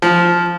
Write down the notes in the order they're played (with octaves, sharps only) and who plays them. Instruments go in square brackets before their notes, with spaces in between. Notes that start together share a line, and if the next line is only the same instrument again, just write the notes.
[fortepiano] F3